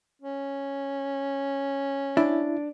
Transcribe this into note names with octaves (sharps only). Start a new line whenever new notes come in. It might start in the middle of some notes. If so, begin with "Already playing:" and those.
C#4
D4 E4